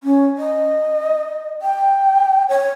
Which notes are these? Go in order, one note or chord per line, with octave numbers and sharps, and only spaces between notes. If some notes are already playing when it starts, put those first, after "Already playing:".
C#4
D#5
G5
C#5